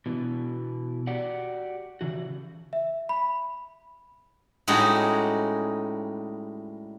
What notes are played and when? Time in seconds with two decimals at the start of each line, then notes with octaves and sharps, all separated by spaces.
0.06 B2 E3
1.07 F#4 G4 D5 F#5
2.01 C#3 E3 F#4
2.73 E5
3.09 B5
4.68 A2 G3 G#3 C#4 D#4 F#4